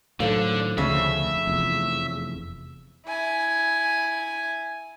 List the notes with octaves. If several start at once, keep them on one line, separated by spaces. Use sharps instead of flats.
A2 D3 D#3 F#3 A4 C5 F5
F1 D2 C#3 F3 A3 E5
F1 E2
E4 G#5